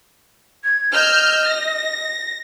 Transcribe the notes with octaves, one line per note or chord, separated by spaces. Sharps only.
G#6
D#5 E6 F6 G6
A#6